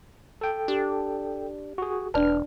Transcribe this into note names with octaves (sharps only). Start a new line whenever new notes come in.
A4 G5
D4 G4
F#4 G#4
E1 D4 B4 D5 A5 F6